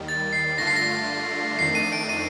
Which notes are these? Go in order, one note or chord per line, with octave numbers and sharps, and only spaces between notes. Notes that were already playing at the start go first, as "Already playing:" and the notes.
Already playing: D#2 D#3 G3
A6
C7
G2 D3 A3 D4 F4 A#6
C7
A#6
F2 D#3 A3 D4 C7
D#7
D7
D#7